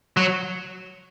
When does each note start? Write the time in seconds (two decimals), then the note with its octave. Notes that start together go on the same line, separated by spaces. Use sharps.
0.17 F#3